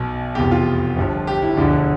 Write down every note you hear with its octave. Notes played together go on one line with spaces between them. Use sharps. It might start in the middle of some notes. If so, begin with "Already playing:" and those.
Already playing: B1 B2
F1 E2 B2 G4
F4
G1 G2 F3
G4
E4
E1 D2 D3 F3 D4